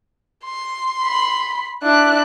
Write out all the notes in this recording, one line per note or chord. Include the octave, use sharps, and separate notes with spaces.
C6
B5
D4 E4 F#6